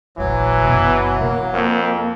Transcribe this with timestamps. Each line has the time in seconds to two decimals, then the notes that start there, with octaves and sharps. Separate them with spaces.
0.18 F1 A#1 E3 F#3
0.65 F#1 B2
1.21 A#3 E4
1.54 F2